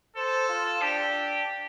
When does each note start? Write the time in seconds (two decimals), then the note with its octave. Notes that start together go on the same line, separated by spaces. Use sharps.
0.16 A4 C5
0.49 F4
0.82 D4 G4